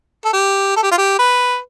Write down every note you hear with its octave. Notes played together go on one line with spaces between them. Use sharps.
A4
G4
A4
G4
F4
G4
B4